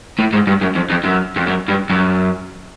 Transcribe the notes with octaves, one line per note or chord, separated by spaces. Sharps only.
A2
G#2
G2
F#2
F2
F2
F#2
F2
F#2
G2
F#2